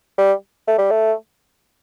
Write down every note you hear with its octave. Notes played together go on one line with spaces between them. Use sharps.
G3
A3
G3
A3